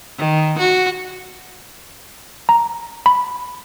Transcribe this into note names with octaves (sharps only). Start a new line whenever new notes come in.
D#3
F#4
A#5
B5